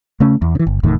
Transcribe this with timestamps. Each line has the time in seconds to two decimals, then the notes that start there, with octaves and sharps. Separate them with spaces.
0.20 C#3 A3 C#4
0.42 E2
0.55 C#3 E3
0.67 G1
0.83 F1 E2 A2 D#3